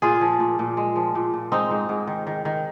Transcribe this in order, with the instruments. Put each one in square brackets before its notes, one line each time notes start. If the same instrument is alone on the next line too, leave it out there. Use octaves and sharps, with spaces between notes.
[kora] A#2 F4 G#4
F3
A#2
A#2
G#3
F3
A#2
A#2
G#3 C4 D#4
G#2
G#2
D#3
D#3
D#3